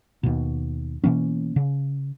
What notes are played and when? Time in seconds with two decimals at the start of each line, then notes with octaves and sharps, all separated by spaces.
0.23 D#2 B2
1.04 B2 E3 A#3 C#4
1.56 C#3